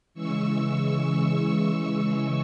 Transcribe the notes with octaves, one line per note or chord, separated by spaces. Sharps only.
C#3 E3 G#3 C#6 E6
C#6 E6